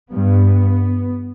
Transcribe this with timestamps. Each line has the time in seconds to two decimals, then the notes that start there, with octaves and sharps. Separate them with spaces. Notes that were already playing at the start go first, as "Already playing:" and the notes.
0.11 G2 B3